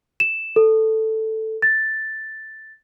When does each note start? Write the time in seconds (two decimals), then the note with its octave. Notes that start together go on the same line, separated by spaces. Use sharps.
0.20 E7
0.56 A4
1.62 A6